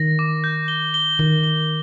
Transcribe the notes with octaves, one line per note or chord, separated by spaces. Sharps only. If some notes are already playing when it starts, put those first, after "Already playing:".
Already playing: D#3 A#6
D6
G6
G7
G7
D#3 G7
G7